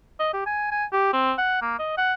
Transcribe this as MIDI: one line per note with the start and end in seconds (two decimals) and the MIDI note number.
0.20 0.29 75
0.34 0.44 67
0.46 0.66 80
0.71 0.85 80
0.93 1.10 67
1.13 1.33 60
1.38 1.59 78
1.62 1.77 58
1.79 1.93 75
1.97 2.14 78